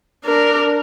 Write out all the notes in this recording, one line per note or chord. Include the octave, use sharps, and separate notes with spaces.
D4 A#4